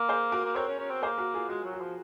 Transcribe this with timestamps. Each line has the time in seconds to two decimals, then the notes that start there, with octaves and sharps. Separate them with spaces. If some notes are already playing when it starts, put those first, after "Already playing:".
Already playing: A#3
0.09 G#4 C5
0.32 F#4 A#4
0.45 A#3
0.55 C4 A#4 C#5
0.68 C#4
0.79 C#4
0.90 C4
1.02 A#3 G#4 C5
1.18 F#4 A#4
1.34 F4 G#4
1.49 G#3 F#4
1.65 F#3
1.73 F#4
1.81 F3